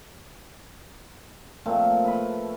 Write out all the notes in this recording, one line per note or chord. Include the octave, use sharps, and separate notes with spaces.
A#2 F3 A3 C4
B4 B5